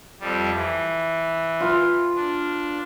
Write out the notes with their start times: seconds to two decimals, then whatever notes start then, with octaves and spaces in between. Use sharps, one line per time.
0.20 F2 G3
0.54 E3
1.60 F4 B4
2.16 D4